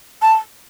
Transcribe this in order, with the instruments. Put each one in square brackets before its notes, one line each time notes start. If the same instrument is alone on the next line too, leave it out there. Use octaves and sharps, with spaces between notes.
[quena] A5